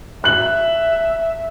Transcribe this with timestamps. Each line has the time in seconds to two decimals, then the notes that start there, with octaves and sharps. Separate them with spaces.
0.24 E5 F#6 F#7